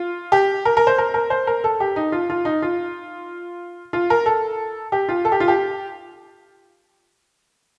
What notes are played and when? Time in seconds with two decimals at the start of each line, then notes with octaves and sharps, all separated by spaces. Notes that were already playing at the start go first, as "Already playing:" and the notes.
Already playing: F4
0.32 G4
0.65 A#4
0.77 A#4
0.87 C5
0.98 A#4
1.14 A#4
1.30 C5
1.47 A#4
1.64 A4
1.80 G4
1.96 D#4
2.12 F4
2.30 F4
2.45 D#4
2.62 F4
3.93 F4
4.10 A#4
4.26 A4
4.92 G4
5.09 F4
5.25 A4
5.32 G4
5.40 F4
5.48 G4